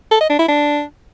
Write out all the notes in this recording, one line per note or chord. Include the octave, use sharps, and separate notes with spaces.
A4
D#5
D4
E4
D4